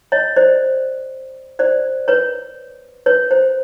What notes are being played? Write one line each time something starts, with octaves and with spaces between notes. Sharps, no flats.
C#5 D#5
C5 D5
C5 D5
B4 C#5
B4 C#5
C5